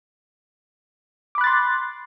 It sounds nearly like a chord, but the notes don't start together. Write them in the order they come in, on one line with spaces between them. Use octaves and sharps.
D6 B5 F#6 A6 C6